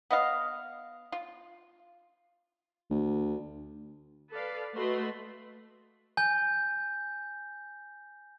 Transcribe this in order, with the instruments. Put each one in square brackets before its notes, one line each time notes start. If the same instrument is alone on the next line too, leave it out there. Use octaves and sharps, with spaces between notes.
[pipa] B3 D#5 F5
F4
[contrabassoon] D2
[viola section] A4 B4 D5 F5
A3 F#4 B4 D#5 B5 C6
[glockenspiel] G#5 G6